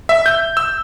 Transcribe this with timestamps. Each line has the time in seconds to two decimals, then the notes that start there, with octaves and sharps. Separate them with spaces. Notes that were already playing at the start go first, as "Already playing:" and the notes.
0.09 E5
0.26 G6
0.57 E6